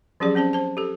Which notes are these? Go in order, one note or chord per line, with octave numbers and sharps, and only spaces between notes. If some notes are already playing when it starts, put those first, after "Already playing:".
F3 F#3 C#4 G4 G#4 D5
C4 C#4 C5 A5
C5 A5
G4 A4